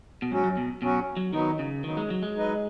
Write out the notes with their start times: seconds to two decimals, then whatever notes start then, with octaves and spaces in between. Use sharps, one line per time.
0.22 B2
0.31 G#2 F#3 C#4 F#4
0.44 F#2
0.57 B2
0.82 B2 F#3 C#4 F#4
1.17 F#3
1.33 D#3 F#3 B3 D#4
1.59 C#3
1.84 D#3 F#3 B3 D#4
1.97 G#3
2.10 F#3
2.23 G#3
2.36 F#3 D#4 B4 D#5